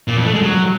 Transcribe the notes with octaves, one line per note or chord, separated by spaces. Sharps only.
A#2
F2
A3
G#3
F#3